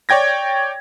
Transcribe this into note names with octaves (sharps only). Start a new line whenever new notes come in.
C#5 D5 G5 G#6 A#6